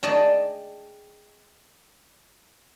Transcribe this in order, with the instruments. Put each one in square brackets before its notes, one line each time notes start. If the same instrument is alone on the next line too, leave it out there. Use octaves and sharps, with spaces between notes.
[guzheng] G#4 D5 D#5 G5 A5